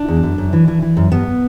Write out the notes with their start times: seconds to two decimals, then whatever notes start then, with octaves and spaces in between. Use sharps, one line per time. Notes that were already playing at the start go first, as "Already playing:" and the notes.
Already playing: D4
0.08 E2
0.23 F#2
0.38 F#2
0.53 E3
0.68 E3
0.82 E3
0.97 F#2
1.12 G2 B3